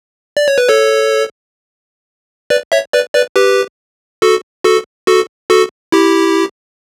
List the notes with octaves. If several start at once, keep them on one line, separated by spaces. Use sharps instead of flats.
D5
C#5
B4
A4 C#5
B4 D5
C#5 E5
B4 D5
B4 D5
G4 B4
F#4 A4
F#4 A4
F#4 A4
F#4 A4
E4 G4